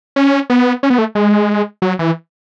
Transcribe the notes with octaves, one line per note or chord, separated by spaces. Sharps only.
C#4
B3
C#4
B3
A3
G#3
F#3
E3